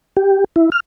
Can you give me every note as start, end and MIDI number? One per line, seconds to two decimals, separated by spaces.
0.17 0.44 67
0.56 0.70 64
0.72 0.80 89